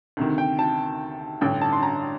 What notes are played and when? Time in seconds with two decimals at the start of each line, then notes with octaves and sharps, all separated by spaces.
0.17 D2 C3 D#3
0.38 G5
0.59 A5
1.41 A1 G2 D3 G5
1.61 A5
1.73 C6
1.83 A#5